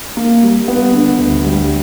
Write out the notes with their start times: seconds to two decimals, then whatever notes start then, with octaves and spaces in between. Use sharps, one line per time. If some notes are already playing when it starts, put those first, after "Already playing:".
0.17 A#3
0.43 G3
0.68 B3
0.94 D3
1.18 D2
1.44 G3